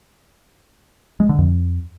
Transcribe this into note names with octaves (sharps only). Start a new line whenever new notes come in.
G#3
D3
F2